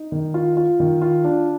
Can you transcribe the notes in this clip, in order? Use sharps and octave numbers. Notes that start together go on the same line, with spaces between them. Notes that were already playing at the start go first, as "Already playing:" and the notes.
Already playing: D#4
D#3
F4
F4
D#3
F4
D4